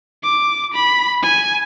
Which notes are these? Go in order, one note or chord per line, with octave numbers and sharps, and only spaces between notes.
D6
B5
G#5